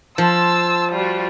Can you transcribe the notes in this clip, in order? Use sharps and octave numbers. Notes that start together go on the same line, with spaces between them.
F3 A5 C6 E6
G3 F4 F#4